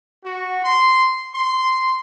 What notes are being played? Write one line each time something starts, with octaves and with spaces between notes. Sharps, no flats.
F#4
C6
C6